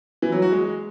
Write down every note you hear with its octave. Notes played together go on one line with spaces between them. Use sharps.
E3
F#3
F#4
G#3